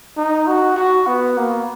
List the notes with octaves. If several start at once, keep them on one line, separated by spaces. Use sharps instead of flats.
D#4
F#4
F#4
B3
A#3